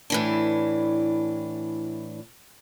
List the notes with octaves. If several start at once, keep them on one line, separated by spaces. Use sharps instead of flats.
A2 E3 D4